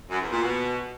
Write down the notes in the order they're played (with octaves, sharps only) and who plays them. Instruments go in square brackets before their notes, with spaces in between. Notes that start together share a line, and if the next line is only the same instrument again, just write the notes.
[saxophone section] F#2
E2
A#2
B2